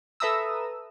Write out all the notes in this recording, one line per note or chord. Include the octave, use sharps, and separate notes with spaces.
A4 B4 E5 A#5 D#6 E6